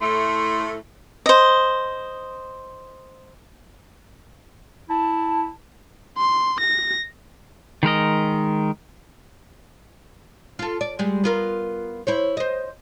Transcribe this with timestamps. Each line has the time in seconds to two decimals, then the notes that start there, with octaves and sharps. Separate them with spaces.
0.01 A2 A3 C6
1.26 C5 D#5
4.89 E4 A5
6.17 C6
6.60 A#6
7.83 D#3 G#3 A#4 D#5
10.59 F4 A4
10.81 D5
10.99 G3 G#3
11.24 B3 F4 A#4
12.07 E4 C5 C#5
12.37 C5 D#5